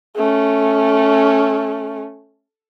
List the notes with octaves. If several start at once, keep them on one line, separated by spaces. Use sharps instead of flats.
A3 C#4